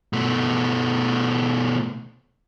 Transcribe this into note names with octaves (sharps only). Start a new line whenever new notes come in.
B2 A3